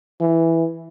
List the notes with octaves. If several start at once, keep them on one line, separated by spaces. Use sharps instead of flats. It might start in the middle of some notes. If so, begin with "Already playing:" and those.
E3